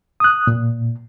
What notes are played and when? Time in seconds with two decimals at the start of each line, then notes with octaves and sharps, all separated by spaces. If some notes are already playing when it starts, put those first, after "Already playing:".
0.20 D#6 F#6
0.47 A#2